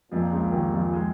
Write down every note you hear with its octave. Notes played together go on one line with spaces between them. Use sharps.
F2 A#2 F3
C#2 C#3
D#2 A#2 D#3
F2 F3
G#3